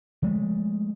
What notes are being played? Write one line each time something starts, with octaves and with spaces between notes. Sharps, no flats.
F3 G#3 A3